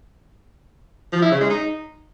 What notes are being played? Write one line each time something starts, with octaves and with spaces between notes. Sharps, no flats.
F3
E4
C#3
G#3
D#4